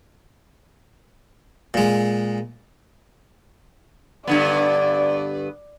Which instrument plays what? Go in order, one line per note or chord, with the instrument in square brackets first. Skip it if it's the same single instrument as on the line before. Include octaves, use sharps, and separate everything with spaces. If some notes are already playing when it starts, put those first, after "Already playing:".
[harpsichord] A#2 G#3
[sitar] G2 D3 B3 [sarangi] D5